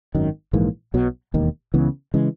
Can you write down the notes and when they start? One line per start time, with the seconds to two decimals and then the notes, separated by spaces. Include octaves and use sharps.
0.15 G#1 F#2 D#3
0.53 A#1 G#2 E3 A#3
0.94 B1 B2 F#3
1.34 E1 D#2 D#3
1.74 C#2 C#3 E3 B3
2.14 C#3 E3 G#3